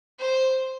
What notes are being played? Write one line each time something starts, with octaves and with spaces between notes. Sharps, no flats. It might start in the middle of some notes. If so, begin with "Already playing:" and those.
C5